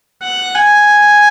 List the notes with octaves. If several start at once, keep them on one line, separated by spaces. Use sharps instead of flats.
F#5
G#5